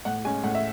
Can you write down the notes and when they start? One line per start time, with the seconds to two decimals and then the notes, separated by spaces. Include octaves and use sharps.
0.05 A2 F#5
0.24 G#3 C#4 G#5
0.44 A2 F#5
0.55 E5